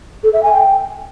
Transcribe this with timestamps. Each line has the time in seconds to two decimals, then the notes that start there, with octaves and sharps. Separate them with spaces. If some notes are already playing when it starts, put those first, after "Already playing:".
0.23 A4
0.33 E5
0.43 G#5
0.53 G5